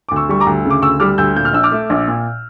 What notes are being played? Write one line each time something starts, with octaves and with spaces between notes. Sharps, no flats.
D2 D6
C#6 E6
G3 C#6
A#5 D6
D2
C#3
D6
D2 C#6 E6
G3 D6 F6
D2 E6 G6
A#2 G6
F6
A#1 E6
D6 F6
A3
A#1
A#2